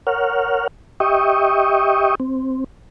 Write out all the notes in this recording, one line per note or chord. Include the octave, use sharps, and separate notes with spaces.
A#4 C#5 F#5 F6
G4 D#5 E5 G5 C#6 D#6
C4